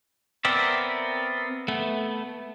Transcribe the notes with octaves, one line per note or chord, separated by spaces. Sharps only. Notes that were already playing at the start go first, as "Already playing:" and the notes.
B3 C4 A#4 D5 E5
A3 B3